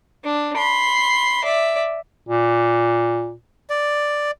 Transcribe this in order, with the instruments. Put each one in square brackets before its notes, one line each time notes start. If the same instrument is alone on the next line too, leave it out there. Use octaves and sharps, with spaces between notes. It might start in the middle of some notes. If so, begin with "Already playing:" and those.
[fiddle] D4
B5 C6
D5 E5
[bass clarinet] A#2
[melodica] D5